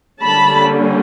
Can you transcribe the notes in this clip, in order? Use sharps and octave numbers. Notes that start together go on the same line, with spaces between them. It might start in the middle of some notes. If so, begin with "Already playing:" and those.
D3 G3 A#3 C#4 A5 B5